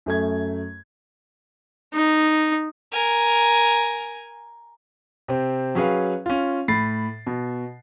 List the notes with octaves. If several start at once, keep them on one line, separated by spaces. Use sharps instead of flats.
F#2 A3 G#6
D#4
A#4 G#5
C3 C4
F#3 C#4 G#4 B4 F5
C#4 F4
A2 B5 A6 C7
B2